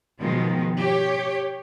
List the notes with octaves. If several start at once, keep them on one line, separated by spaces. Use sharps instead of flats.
B2 D#3 F3 G#3
G4 C#5